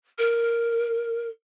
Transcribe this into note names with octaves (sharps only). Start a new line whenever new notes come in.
A#4